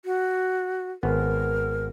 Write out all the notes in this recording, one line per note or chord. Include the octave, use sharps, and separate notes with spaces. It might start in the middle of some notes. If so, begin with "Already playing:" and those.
F#4
G#1 B3 A#4